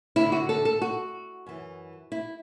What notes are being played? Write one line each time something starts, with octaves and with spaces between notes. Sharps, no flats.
D2 D3 E4
F#4
A4
A4
F#4
F#2 E3
E4